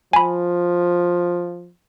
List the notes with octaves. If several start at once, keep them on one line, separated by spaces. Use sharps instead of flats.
F3 G#5 B5